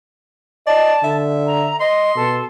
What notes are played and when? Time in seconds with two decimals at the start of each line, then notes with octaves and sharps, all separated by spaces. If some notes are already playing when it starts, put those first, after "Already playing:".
0.67 D5 D#5 A5
1.04 D3 E5
1.47 A#5
1.80 D#5 C6
2.16 B2 A4